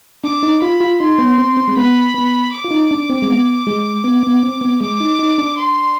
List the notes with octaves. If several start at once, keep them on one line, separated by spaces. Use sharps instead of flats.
D4 D6
D#4
F4 B5
F4
D#4 C6
B3
C4
C4
G#3
B3 B5
B3
D6
F4
D#4
D4
C4
G#3
B3
G#3
B3
B3
C4
B3
G#3 D6
D#4
D#4
D4
C6